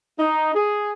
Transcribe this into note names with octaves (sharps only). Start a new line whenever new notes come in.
D#4
G#4